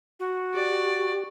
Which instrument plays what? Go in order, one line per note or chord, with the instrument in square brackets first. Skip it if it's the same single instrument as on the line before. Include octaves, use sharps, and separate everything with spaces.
[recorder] F#4
[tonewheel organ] G4 [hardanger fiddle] D5